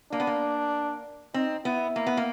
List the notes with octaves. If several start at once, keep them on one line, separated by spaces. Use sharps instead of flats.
A#3 D4
B3
A#3
C4 D#4
B3 E4
A#3
B3
A#3